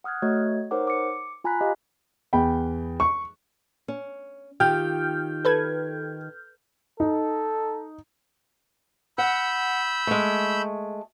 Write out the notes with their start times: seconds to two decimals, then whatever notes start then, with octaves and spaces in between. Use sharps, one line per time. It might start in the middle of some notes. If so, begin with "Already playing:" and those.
0.04 F#5 D#6 F6 F#6 G#6
0.22 A3 F#4 C#5 D#5 G#6
0.71 D#4 A#4 C5 C#5 F#5 D6
0.87 D6 C#7
1.44 F4 G#5 A#5 B5 F#6 B6
1.61 G4 D#5 F5
2.33 E2 G5 B5
3.00 C#6
3.88 C#4
4.60 D#3 F4 G4 G5 F6 G6
5.45 A4 B4 G#6
7.00 D#4 A4
9.18 F#5 B5 E6 G6
10.07 G#3 A3